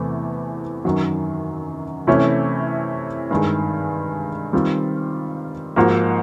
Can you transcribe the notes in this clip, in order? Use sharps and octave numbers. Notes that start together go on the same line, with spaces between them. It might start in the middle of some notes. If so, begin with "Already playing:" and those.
Already playing: E2 C3 E3 A3
F#2 D#3 F#3
C3 E3 A3 C#4 E4
G2 D#3 G#3
D#3 G3 C4 F4
G#2 F3 A#3 D#4 F#4